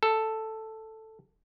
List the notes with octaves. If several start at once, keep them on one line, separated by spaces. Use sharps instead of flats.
A4